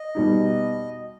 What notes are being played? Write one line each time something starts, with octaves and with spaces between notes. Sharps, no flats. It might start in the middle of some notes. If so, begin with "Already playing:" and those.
Already playing: D#5
B2 G3 D#4